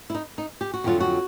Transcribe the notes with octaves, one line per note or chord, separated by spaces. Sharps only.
E4
D#4
D#4
G4
F#4
F2 D3 F#3 F4
F#4